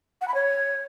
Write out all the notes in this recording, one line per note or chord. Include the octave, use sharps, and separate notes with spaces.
F#5
B5
C#5